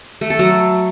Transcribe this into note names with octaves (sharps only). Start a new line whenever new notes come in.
A3
A4
F#3